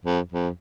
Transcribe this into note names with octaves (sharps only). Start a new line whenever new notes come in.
F2
F2